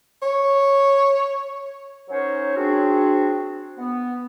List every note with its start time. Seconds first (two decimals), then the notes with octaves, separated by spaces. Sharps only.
0.22 C#5
2.09 F#3 C#4 D#4 A#4 C5 C#5
2.55 C4 D4 F#4 G#4
3.78 B3